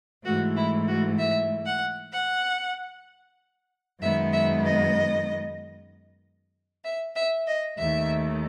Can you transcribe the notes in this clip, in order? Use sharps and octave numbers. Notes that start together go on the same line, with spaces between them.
G#2 E3 A3 F#4
E4
F#4
E5
F#5
F#5
F#2 D#3 G#3 B3 E5
E5
D#5
E5
E5
D#5
D#2 D#3 A3 E5